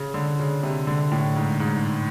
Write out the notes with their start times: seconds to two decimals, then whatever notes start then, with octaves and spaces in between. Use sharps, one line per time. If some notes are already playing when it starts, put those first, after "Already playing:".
Already playing: C#3
0.14 D3
0.39 C#3
0.63 C3
0.87 D3
1.12 A2
1.36 G#2
1.60 G#2